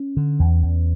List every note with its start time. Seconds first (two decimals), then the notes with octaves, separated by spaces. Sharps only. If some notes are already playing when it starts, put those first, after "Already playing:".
Already playing: C#4
0.17 D3
0.39 E2
0.63 E2